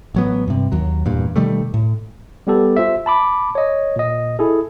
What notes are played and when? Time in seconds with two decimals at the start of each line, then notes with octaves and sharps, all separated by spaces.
0.15 A1 F#3 B3
0.48 G2 C3
0.72 D#2 F#3
1.05 E2 G2 A#2
1.36 B2 D#3 G3 A3
1.74 A2
2.47 G3 B3 G4 A4
2.77 F4 C5 E5
3.06 A5 B5 D6
3.55 C#5 D#5
3.96 A#2 D#5
4.39 E4 G#4 A4